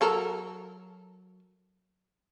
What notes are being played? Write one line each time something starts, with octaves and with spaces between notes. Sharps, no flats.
F#3 A4 A#4